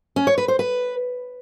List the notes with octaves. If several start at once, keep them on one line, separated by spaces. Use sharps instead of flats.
C#4
C#5
B4
C5
B4